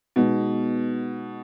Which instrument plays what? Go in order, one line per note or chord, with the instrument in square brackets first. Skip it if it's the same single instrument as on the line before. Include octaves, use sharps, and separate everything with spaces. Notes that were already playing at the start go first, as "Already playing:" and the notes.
[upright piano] B2 [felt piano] G#3 B3 D#4